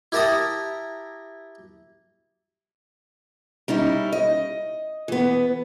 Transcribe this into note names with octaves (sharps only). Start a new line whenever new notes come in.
E4 G4 A#4 A5 A#5 D#6
G3 C#4 D#4 E4
D#5
E3 B3